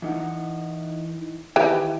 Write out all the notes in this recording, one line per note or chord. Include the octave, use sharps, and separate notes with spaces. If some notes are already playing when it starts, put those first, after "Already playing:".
E3 D#4 F#5
D#3 E3 G4